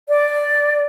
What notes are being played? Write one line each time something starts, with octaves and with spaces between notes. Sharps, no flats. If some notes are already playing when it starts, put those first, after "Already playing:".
D5